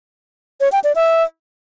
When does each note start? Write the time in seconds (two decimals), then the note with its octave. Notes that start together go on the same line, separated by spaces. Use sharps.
0.61 C#5
0.72 G5
0.84 D5
0.96 E5